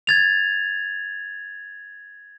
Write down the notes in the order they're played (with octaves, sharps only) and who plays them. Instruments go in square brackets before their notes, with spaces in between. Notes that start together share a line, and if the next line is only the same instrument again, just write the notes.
[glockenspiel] G#6 A6 F7